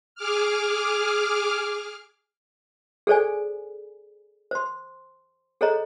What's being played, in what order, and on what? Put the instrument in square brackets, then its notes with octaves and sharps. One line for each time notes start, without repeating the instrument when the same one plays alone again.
[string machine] G#4 D6 F6
[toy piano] G#4 A4 C5 D5 G#5
C5 C6
G#4 A4 C5 C#5 D#5 A#5